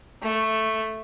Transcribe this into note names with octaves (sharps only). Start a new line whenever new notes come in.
A3